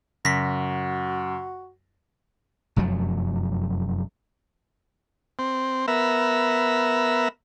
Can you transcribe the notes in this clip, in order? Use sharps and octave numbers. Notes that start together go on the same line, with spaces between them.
F#2 C#3 F#4 A#6 B6
F1 F#2 F3 F#3
C4
B3 A#4 E5